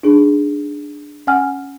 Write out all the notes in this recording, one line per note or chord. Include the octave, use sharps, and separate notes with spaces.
D4 D#4 G#4
C#4 F#5 G#5 F6